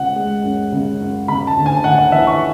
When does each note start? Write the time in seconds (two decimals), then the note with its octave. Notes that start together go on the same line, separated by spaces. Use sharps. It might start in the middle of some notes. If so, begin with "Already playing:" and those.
Already playing: C#2 F#5
0.16 G#3
0.43 F#2
0.72 C#3
1.01 F#2
1.28 C#3 B5
1.47 A5
1.57 D2
1.66 G#5
1.84 D2 F#5
1.98 F#5
2.12 E3 E5
2.27 C#6